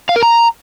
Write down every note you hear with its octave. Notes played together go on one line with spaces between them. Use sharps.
F5
A#4
A#5